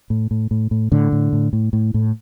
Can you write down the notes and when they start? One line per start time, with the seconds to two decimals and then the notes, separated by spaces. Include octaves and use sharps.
0.10 A2
0.31 A2
0.51 A2
0.71 A2
0.92 A2 D3
1.12 A2
1.33 A2
1.53 A2
1.73 A2
1.94 A2